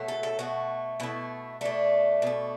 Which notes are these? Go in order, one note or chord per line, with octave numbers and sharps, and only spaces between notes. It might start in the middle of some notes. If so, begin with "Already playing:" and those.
Already playing: B2 F#3 A3
A4
A4
B2 A3 F#4
B2 A3 E4
B2 A3 D4
B2 A3